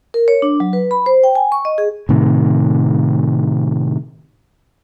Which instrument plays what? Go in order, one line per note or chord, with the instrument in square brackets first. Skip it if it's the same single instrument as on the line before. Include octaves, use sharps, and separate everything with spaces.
[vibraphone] A#4
C#5
D4
F#3
B4
B5
C5
G5
G#5
C#6
D#5
G#4
[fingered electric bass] A2 C3 D#3